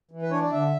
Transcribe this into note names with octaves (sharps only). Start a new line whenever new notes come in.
E3
B4
D4 C#5
D5
D3 E5